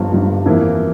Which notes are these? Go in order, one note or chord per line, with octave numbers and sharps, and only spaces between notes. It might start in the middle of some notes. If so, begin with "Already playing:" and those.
Already playing: G1 G2 F3
G1 G2 F3
F2 E3 A#3 E4